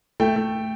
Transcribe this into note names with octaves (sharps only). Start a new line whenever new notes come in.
A3 G5
A3